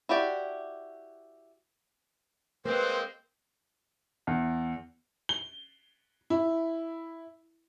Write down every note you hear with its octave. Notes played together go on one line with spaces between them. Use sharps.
E4 F#4 G4 D5
G#3 A#3 C4 B4 C5
E2
G7
E4